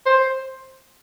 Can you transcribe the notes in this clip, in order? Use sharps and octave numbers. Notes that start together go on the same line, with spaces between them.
C5